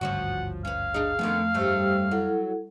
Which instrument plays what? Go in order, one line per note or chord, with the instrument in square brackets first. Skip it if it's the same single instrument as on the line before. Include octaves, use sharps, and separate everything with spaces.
[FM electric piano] G#1 D2 G2 [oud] F3 C#4 F#4 [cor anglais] F#5
[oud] C#4 B4 [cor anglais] F5
[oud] D4 D#4 [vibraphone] G#4
[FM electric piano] F2 [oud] D3 D#3 B3 [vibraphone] A3
[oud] G2 C#3 A3 [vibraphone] G4 C5 E6
[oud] F#3 [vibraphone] E4 A4 F#5